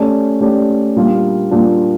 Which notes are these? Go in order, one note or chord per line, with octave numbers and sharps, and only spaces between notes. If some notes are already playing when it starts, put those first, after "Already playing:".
Already playing: A3 C#4 G4 D5
A3 C#4 G4 D5
A#2 G3 D4 F4
A#2 G3 D4 F4